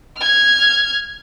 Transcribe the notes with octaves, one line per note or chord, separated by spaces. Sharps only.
F6 G#6